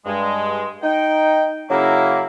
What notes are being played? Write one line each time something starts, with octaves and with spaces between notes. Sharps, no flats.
G2 G#3
D#4 G5
C#3 F#3 A#3 E4